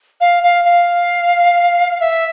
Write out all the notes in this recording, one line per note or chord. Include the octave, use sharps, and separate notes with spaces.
F5
F5
F5
E5